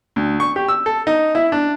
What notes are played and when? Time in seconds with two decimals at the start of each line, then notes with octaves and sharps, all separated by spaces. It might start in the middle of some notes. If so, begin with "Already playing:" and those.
0.16 D2
0.40 C#6
0.56 G4
0.68 E6
0.86 A4
1.07 D#4
1.35 E4
1.52 D4